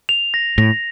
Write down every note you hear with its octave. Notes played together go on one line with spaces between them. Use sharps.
F7
A#6
A2 A#6